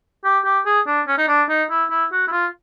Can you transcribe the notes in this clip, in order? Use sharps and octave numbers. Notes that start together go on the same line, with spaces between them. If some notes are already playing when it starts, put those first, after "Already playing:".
G4
G4
G#4
D4
C#4
D#4
D4
D#4
E4
E4
F#4
E4
F4